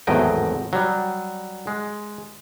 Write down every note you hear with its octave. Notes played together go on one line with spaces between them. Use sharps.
G#1 E2 A2 F#3 D#5 G5
F#3 G3
G#3